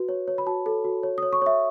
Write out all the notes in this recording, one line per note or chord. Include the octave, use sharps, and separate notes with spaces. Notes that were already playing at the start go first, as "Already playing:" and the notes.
Already playing: F#4 B4
C#5
C#5
B5
F#4 A5
A4
F#4
C#5
C#5 D#6
C#6
C#5 E5